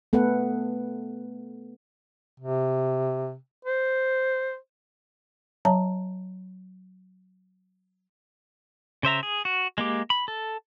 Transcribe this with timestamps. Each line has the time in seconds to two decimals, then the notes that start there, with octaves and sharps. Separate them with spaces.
0.13 A3 B3 A4 B4 F#5
2.40 C3
3.65 C5
5.65 F#3 C#5 E5 A5 A#5
9.03 C#3 C5 E5 A#5
9.23 G#4
9.45 F#4
9.78 G#3 A#3 G4
10.10 B5
10.28 A4